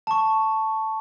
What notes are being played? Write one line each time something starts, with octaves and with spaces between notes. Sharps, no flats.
A5 C#6